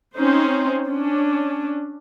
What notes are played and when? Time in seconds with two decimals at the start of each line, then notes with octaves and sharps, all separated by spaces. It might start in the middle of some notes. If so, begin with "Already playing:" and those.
0.16 C4 C#4 D#4 C5
0.88 C#4 D4